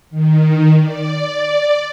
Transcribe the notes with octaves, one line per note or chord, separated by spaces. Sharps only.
D#3
D5